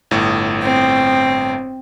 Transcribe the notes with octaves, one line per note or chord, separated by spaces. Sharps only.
G1 A2
C4